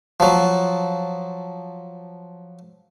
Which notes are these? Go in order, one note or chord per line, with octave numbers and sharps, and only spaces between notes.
F3 F#3